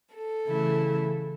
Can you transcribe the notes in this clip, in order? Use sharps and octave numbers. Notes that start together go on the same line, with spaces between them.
A4
C#3 E3 A3 E4